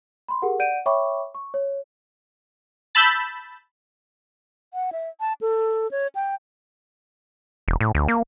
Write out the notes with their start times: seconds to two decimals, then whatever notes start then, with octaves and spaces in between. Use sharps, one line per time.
0.29 B5 C6
0.42 G4 G#4 A#4 F#5
0.59 D5 F#5 G6 D7 D#7
0.86 C#5 E5 G5 B5 C#6 D6
1.35 C#6
1.54 C#5
2.95 A5 B5 E6 G6
4.74 F#5
4.93 E5
5.20 A5
5.41 A4
5.91 C#5
6.15 G5
7.68 E1
7.80 A2
7.95 D2
8.08 A#3